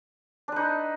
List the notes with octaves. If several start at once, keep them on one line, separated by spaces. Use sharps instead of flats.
D4 D#4 B4